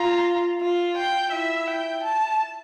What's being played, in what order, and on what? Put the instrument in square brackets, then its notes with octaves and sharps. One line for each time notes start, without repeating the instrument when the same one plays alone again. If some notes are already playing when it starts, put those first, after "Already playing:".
Already playing: [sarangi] F4 [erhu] A#5
[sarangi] F4
[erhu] G5
[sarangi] E4 [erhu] E5
[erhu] G5
A5